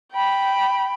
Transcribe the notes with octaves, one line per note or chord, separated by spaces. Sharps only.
G5 B5